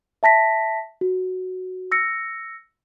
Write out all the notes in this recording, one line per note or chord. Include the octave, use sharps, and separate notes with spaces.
E5 A5 A#6 B6
F#4
E6 A#6 C#7